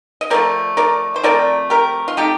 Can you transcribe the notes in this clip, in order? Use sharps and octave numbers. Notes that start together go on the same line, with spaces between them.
D#5
F3 A3 C4 A#4 D5
A#4 D5
C5
F3 A3 C4 A#4 D5
G4 A#4
F4
F3 A3 C4 D#4 G4